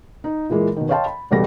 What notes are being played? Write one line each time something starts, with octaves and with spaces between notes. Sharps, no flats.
D#4
A#2 E3 G#3 A#3
B2 D#3
C#5 D#5 F5 G5 A5 C6
B5
A1 E2 B2 G3 A3 A#6